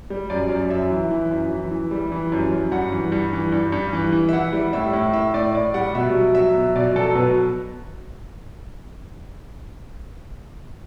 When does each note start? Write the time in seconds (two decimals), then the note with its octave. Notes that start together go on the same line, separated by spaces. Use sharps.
0.10 G3
0.30 F#2 D5
0.49 F#2
0.70 F#2 E5
0.90 E3
1.11 E3
1.31 F#2
1.51 E3
1.71 E3
1.91 G3
2.12 E3
2.32 F#2
2.52 F#2
2.72 G2 F#5
2.92 E3
3.12 G2
3.33 E3
3.52 G2
3.72 G2
3.93 E3
4.12 E3
4.29 E5
4.33 E3 F#5
4.53 G3
4.73 A2 E5
4.93 A2
5.14 A2 E5
5.34 A2 D5
5.54 A2 D5
5.74 G3 F#5
5.95 B2 E5
6.15 F#3
6.34 F#3 E5
6.55 B2
6.76 B2 D5
6.95 F#3 A4
7.15 B2 B4